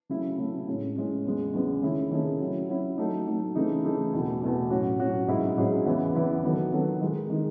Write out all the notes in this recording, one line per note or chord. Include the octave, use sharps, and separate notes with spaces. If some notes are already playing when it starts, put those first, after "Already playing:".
C#3 F#3 A3 E4
C#3 F#3 A3 E4
A2 G#3 C#4
A2 G#3 C#4
E2 C#3 G#3
E2 C#3 G#3
D#3 A3 C#4 E4 G#4
D#3 A3 C#4 E4 G#4
F#3 C#4 E4
F#3 C#4 E4
F#3 A3 D#4
F#3 A3 D#4
C#3 E3 A3 D#4 G#4
C#3 E3 A3 D#4 G#4
E2 B2 A3
E2 B2 A3
A2 F#3 C#4 F#4
A2 F#3 C#4 F#4
G#2 F#3 C#4 E4 G#4
G#2 F#3 C#4 E4 G#4
E2 C#3 E3 B3 E4
E2 C#3 E3 B3 E4
D#3 F#3 B3 F#4 A4
D#3 F#3 B3 F#4 A4
D#3 G#3 D#4 G#4
D#3 G#3 D#4 G#4